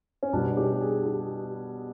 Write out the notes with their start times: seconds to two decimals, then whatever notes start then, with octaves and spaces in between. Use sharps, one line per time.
0.23 C#4
0.33 B2 G3 D4
0.57 G4
0.81 G#4
1.05 G4